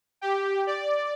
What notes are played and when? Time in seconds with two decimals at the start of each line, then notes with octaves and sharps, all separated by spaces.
0.21 G4
0.67 D5